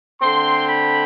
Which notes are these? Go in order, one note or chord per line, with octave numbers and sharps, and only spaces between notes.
D3 A3 C4 C6
B5